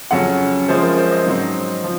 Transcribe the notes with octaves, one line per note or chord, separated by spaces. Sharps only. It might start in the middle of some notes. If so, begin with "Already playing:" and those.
F2 C#3 F#3 C#4 F#5
F#2 F3 G#3 C#4 C5
A#4
C5
D#5
G#2 F#3 C4 D#4
F3